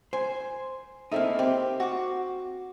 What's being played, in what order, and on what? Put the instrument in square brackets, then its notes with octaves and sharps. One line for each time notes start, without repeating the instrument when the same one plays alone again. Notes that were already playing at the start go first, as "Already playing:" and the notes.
[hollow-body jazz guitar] C5 [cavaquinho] G#5
[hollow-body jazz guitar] A#3 C4 D#4 [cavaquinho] E4 A4
[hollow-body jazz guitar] C4 [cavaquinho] G4
[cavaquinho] F#4 D6